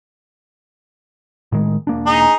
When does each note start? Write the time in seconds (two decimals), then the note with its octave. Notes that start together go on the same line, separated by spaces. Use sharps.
1.52 A2 D#3 G#3
1.87 E1 A#3 D4
2.06 D#4 G#4